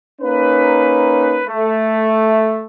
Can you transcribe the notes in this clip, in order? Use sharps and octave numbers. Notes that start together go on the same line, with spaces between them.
A#3 C#4 D#4 B4
A3